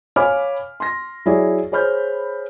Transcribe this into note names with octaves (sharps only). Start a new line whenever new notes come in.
C#5 F5 G#5 B5 D6 F6
C6 A#6
F#3 E4 G#4 C#5 D5
G#4 C5 C#5 B5 F6 G6